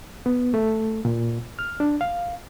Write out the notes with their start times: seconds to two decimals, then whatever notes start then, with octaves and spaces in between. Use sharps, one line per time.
0.26 B3
0.54 A3
1.05 A#2
1.59 F6
1.80 D4
2.01 F5